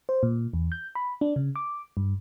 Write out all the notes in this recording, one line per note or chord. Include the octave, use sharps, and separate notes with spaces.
C5
A#2
E2
G6
B5
D4
C#3
D6
G2